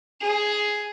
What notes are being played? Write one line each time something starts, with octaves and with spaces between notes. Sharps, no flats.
G#4